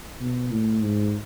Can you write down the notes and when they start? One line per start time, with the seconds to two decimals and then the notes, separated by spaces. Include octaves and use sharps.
0.21 B2
0.52 A2
0.82 G#2